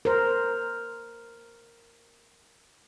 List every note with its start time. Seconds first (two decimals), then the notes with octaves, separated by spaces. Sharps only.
0.05 A#4 C5